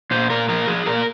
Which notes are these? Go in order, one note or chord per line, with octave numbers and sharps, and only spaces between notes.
A#2 C5
A#2 A#4
F3 A#4
F3 G#4
A#2 A#4